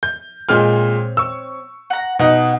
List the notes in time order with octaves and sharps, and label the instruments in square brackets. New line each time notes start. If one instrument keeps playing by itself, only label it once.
[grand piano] G6
[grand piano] A#2 G#3 F6 [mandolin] C4 C#5 G5
[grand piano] C#6 E6
[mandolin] F#5 A#5
[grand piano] B2 D#4 [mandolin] F#5